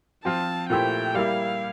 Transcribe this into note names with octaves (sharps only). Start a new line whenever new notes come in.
F3 C4 F4 A5
A#2 A3 E4 G4 C5 G5
G3 A#3 E4 G4 F5